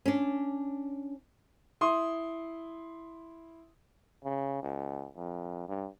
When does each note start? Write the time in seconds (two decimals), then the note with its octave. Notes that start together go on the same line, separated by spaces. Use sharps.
0.06 C#4 D4
1.81 E4 C6 D#6
4.24 C#3
4.62 C#2
5.16 F2
5.68 G2